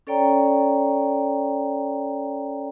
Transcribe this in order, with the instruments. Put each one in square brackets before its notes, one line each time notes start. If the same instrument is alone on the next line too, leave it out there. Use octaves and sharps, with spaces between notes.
[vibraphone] C#4 A4 C#5 D5 G5 A#5